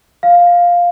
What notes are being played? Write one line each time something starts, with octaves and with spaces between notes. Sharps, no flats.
F5